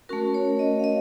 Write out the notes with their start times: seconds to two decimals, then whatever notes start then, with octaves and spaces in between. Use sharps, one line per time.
0.09 A3 C#4 F#4 A#4
0.34 C#5
0.59 D#5
0.79 F5
0.84 D#5